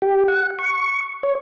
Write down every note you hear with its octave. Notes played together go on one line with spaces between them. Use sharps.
G4
F#5
C#6
C#5